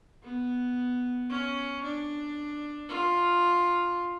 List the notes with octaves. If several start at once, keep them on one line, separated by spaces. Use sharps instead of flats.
B3
C#4
D4
F4